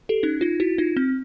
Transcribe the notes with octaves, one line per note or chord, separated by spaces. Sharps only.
G4 A4
C#4 D#4
D#4 F4
E4 F#4
D#4 F4
C4